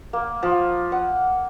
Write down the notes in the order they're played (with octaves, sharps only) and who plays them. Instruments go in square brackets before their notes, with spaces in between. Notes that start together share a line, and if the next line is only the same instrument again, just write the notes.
[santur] A#3
F3
F#5